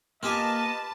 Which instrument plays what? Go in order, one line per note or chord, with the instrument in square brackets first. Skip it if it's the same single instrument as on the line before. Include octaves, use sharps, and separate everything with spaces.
[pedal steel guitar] A#3 [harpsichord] F4 G4 G#5 [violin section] B4 A5 [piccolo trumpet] D#5